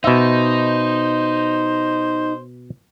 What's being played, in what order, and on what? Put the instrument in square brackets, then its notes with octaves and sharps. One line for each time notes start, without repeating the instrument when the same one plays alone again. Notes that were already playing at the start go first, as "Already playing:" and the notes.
[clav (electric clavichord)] B2 E5 [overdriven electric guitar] D#4 [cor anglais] C5